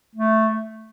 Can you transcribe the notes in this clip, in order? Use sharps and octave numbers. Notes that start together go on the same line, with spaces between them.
A3